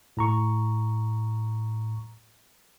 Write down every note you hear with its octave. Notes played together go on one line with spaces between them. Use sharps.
A2 A#5 C#6